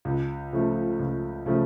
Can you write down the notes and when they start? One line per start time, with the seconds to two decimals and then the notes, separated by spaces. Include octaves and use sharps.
0.05 C#2
0.53 C#3 F3 A3
0.99 C#2
1.46 C#3 F3 A3